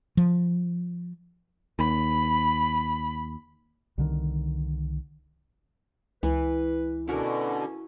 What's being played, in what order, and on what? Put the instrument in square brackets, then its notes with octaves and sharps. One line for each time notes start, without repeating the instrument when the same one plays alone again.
[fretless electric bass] F3
[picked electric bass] D#2 [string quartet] B5
[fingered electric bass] C2 D3 D#3
[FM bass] C#2 [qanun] E3 [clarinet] B4
[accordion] B2 D3 [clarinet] C#4 [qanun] E4 F#4 A#4